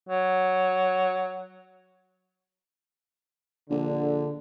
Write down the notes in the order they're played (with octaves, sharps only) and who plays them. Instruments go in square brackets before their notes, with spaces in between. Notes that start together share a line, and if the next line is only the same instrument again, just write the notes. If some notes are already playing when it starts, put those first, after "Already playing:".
[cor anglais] F#3
[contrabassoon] A#1 [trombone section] D3